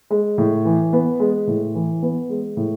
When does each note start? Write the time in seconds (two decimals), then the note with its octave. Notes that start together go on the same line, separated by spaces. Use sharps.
0.11 G#3
0.38 A2
0.65 E3
0.93 B3
1.20 G#3
1.47 A2
1.75 E3
2.02 B3
2.30 G#3
2.57 A2